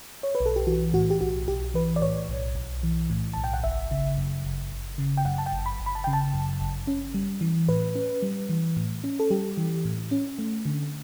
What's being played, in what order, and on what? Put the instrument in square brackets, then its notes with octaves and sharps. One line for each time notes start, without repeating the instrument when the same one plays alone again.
[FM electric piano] C#5
B4
B1
A4
G4
E3 F#4
A2 F#4
G4
B1 F#4
B1 G4
E3 B4
D5
A2 C#5
B1
B1
E3
A2
B1 A5
G5
F#5
G1 E5
C#3
F#2
G1
G1
C#3
G5
F#2 F#5
A5
G5
G1
B5
G1
B5
A5
C#3 G5
A5
F#2
G1
C#4
G3
E3
A2 B4
C#4
G3
E3
A2
C#4
A4
G3 G4
E3
A2
C#4
A3
D3